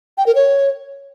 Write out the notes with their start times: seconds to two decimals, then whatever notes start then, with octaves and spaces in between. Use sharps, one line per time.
0.18 G5
0.26 A#4
0.35 C#5